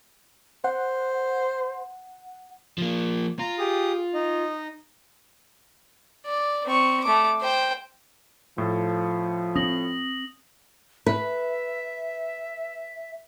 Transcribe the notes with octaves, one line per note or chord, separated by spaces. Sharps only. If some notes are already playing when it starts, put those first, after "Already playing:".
C5 F#5
F3 A#3
F4 A#5
G4 G#4 D#6
D#4 D#5
D5
C4 C#6
A3 D6
C5 G5
A2 F3 A4
C4 C#4 D#6 A#6 F#7
B4 E5